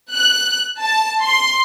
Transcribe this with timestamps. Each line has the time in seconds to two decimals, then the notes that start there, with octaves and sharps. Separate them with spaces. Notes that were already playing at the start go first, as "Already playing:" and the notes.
0.12 F#6
0.81 A5
1.22 C6